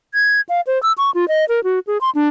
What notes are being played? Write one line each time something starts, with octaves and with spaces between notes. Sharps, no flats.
G#6
F5
C5
E6
C#6
F4
D#5
A#4
F#4
G#4
C6
D4